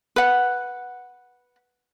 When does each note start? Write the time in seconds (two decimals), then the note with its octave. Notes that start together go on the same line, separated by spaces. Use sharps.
0.16 B4 F#5